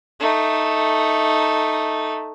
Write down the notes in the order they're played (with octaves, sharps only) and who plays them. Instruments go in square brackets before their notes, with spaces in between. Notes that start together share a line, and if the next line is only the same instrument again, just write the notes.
[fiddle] A3 D#4